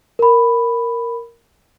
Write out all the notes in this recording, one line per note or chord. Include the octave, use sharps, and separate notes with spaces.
A#4 B5